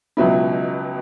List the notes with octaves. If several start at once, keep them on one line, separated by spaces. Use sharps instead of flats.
C#2 B2 F#3 B3 E4